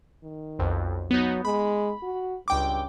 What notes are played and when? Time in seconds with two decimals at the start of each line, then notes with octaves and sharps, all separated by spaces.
0.23 D#3
0.59 B1 F2
1.11 F#3 B3 D#4
1.45 G#3 B5
2.03 F#4
2.48 C#2 G2 G5 D6